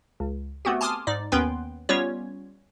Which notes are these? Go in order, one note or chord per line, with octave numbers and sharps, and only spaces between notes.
C#2
A3 B3 C4 F#4 G4
G#5 A5 C6 D6 D#6 F6
G#2 D#4 D5
D#2 B3 C#4 B4 G5 C6
G3 B3 C#4 F4 C#5